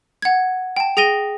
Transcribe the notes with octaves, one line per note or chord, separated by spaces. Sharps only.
F#5 G#6
G5 A5
G#4 G5 A#6 D#7 G7